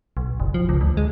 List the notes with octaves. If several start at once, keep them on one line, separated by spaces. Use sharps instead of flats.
B1
F#1
F3
C#2
D2
G#3